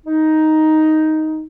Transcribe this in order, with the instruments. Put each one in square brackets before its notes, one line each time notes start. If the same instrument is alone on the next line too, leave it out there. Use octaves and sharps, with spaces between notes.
[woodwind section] D#4